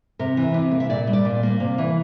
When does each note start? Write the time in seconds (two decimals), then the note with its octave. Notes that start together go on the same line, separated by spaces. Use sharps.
0.19 C3 A#4
0.37 E3
0.54 C3
0.71 A#3
0.80 E5
0.90 A#2 D5
1.07 G3
1.13 D5
1.25 A#2
1.43 A#3
1.60 C3
1.78 E3